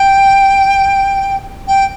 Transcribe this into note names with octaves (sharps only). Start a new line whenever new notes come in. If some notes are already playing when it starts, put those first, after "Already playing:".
Already playing: G5
G5